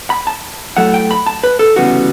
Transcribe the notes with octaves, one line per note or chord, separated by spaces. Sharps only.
B5
A5
A2 F#3 A3 F#5
G5
B5
A5
B4
A4
D2 C#3 E3 G3 B3 F#4